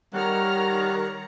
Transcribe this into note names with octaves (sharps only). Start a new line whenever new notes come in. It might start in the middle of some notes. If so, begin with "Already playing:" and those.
D#3 G3 A#4 C#5 F#5 A#5 F6 F#6